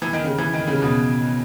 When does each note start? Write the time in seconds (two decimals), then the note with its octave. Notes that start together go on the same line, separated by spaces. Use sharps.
0.02 E3
0.13 D#3
0.24 C#3
0.38 E3
0.53 D#3
0.67 C#3
0.82 B2